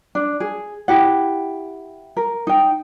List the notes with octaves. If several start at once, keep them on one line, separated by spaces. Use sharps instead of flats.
D4
G#4
E4 G4 F#5
A#4
D#4 G5